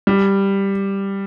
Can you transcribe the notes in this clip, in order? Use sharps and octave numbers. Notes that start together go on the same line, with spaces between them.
G3